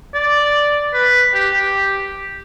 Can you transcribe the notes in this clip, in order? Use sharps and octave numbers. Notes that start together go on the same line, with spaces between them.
D5
B4
G4
G4